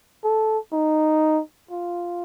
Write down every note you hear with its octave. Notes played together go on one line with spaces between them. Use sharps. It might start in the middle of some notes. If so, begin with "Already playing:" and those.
A4
D#4
F4